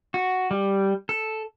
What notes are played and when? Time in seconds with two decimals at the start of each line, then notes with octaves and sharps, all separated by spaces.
0.14 F#4
0.51 G3
1.09 A4